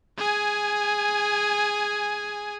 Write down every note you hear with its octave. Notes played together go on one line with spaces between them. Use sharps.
G#4 G#5